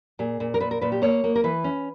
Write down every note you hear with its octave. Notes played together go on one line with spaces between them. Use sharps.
A#2 G#4
A#2
A#4
A#2 B4
A#4
A#2 B4
G4
A#3 C#5
A#3
A#4
E3 B4
C#4